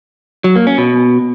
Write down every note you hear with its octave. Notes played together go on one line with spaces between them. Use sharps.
F#3
A#3
C#4
B2